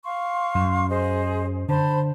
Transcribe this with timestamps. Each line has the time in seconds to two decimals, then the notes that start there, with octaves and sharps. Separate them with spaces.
0.05 F5 C6 C#6
0.55 F#2
0.90 G#4 C5 D#5
1.69 D3 C5 A5 B5